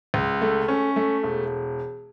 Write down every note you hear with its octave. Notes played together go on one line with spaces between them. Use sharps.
C#2
A3
C#4
A3
E1